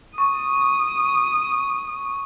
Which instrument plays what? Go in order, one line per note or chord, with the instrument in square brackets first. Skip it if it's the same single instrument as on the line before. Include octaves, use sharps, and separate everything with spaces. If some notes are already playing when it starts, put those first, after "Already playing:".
[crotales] C#6 [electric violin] D#6